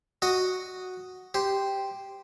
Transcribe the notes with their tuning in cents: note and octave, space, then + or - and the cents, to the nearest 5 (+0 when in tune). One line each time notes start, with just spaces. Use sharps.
F#4 +0 D#5 +0
G4 +0 C5 -10